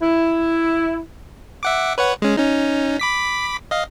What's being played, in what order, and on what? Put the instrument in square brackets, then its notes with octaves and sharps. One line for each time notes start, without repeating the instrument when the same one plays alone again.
[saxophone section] E4
[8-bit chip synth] E5 F#5 D6
B4 C#5 F#5
G#3 C#4
C#4 D#4
B5 D6 B6
D#5 F5